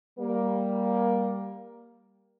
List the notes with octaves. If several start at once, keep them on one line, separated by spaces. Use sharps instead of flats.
G3 A#3